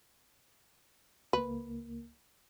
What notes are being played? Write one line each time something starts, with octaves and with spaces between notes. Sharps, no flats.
C#2 A#3 B4